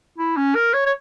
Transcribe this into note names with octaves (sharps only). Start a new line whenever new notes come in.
E4
C#4
A#4
C#5
C#5